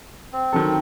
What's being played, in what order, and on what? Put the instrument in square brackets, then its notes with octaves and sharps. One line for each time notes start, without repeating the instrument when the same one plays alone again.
[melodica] C4
[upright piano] D#3 F#3 A4